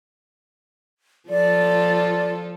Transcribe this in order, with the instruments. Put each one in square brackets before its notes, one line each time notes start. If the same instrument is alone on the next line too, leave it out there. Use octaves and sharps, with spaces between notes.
[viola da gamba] F3 F4 A4 [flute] D5